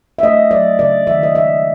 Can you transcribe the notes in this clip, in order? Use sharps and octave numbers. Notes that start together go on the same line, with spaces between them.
E5
A3 D#5
F#3 D5
C#3 D5
D#3 E5
D#5
G#3 E5